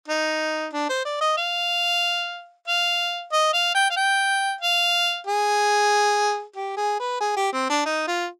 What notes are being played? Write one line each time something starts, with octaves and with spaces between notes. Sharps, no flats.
D#4
D4
C5
D5
D#5
F5
F5
D#5
F5
G5
F5
G5
F5
G#4
G4
G#4
B4
G#4
G4
C4
D4
D#4
F4